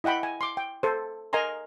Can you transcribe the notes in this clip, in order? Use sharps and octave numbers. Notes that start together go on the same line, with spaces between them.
E4 D#5 F#5 G5 B5
G#5
C6 D6
G5
A4 C5
A#4 D#5 G#5 A#5 C6